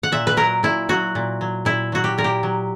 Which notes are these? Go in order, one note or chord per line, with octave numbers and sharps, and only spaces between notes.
F#5
A#2 E5
B4
F#3 A#4
A#2 E4
F#3 F#4
A#2
F#3
A#2 E4
F#3 F#4
G4
A#2 A#4
G4
F#3